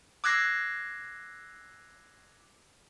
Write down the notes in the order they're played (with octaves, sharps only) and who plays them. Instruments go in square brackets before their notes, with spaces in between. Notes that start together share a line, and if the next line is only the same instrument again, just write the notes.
[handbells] D6 E6 F#6 G#6 A#6 C7